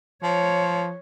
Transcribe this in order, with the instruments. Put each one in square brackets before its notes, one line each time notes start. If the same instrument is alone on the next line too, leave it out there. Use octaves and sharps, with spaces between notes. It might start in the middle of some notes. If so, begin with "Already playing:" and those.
[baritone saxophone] F3 [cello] C#5